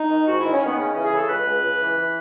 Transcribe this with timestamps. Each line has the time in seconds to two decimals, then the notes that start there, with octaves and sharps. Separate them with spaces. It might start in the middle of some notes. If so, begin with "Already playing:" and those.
Already playing: D#4
0.11 D#3
0.27 G#2 F#4
0.40 D#3 E4
0.52 C#4
0.61 D#3 B3
0.78 C#3 C#4
0.91 E3 C#4
1.03 G#4
1.11 C#3 A4
1.28 C#2 B4
1.46 C#2
1.62 C#2
1.79 E3
1.96 E3